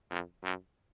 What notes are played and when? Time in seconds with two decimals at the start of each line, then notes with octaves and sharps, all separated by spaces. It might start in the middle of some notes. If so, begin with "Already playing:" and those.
0.11 F2
0.43 F#2